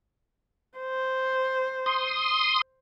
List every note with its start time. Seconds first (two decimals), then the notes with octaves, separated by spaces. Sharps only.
0.78 C5
1.86 C6 D#6